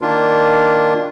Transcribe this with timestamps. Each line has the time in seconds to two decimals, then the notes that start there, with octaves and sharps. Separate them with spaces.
0.01 D#3 A#3 D4 F4